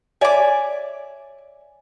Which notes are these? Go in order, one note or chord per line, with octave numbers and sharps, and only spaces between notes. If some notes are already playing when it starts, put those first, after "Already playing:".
C#5 D5 E5 G#5 D6